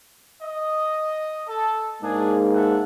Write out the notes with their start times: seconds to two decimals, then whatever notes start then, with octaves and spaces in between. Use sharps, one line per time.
0.42 D#5
1.49 A4
2.03 G#2 G#3 A#3 D4 G#4
2.55 A4 E5 F#5